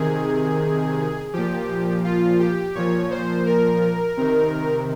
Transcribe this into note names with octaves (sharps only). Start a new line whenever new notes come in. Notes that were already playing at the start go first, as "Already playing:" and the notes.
Already playing: C3 D#3 G#4
A#2 F3 G4
F4
G4
A#2 F3 C#5
C5
A#4
C3 D#3